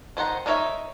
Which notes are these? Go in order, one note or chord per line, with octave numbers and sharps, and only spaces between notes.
D#3 C5 F#5 A#5
D4 D#4 A#4 C#5 E5